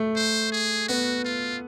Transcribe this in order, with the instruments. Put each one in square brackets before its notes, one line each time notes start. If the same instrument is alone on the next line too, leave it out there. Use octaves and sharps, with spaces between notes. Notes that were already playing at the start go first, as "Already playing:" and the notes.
Already playing: [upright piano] A3
[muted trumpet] C5
G#4
[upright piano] B3 [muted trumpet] F#4
[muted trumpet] F4